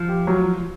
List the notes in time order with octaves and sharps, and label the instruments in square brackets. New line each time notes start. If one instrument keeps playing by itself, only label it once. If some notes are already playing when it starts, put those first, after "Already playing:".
Already playing: [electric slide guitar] F3
[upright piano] G4
F#3